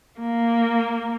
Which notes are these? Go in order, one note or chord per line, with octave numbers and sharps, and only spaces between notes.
A#3